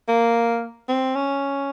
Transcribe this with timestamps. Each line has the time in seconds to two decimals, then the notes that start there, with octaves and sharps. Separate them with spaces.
0.08 A#3
0.88 C4
1.15 C#4